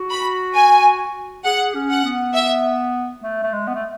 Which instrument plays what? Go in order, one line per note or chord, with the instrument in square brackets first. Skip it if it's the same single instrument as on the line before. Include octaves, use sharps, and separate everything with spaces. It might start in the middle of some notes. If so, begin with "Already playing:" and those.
Already playing: [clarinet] F#4
[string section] B5
G#5
[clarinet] G#4 [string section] F#5
[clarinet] C#4
[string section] F#5
[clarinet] B3
[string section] E5
[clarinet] A3
A3
G#3
B3
A3